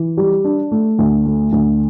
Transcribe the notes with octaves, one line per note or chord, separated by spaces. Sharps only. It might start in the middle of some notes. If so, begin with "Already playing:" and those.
Already playing: E3
G3
D4
A3
D2
A3
D2